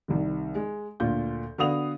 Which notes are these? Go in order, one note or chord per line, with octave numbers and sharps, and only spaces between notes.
C2 C3 D#3
G#3
D2 A#2 F4 G6
D3 B3 F#4 F5 D#6 F7